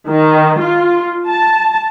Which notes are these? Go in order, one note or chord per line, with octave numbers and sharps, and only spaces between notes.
D#3
F4
A5